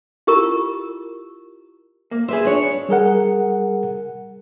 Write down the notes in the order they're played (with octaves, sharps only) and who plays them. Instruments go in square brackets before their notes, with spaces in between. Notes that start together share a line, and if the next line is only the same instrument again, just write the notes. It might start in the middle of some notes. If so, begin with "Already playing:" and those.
[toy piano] E4 F4 G4 A#4 C#6
[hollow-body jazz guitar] A#3
[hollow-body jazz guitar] G#4 B4 E5 [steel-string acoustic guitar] C5
[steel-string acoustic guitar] D4 C#5
[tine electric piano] G3 G#4 A#4 F#5